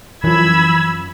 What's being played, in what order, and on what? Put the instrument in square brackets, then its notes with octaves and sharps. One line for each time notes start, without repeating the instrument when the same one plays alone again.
[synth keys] F#2 F3 [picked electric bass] E3 [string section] B5 E6 G#6